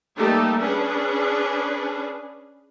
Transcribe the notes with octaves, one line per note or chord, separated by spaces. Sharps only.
G3 A3 A#3 D#4 G4 A4
C#4 D4 G#4 B4